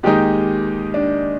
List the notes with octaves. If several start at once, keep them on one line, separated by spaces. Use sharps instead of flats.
D#2 D#3 G#3 D#4 G4
D4